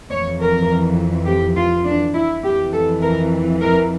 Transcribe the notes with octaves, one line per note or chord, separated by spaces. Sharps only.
F2 E3 C#5
A#4
G4
F4
D4
E4
F2 E3 G4
A4
A#4
A#4